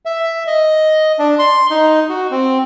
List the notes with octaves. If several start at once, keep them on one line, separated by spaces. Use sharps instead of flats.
E5
D#5
D4
C6
D#4
F#4
C4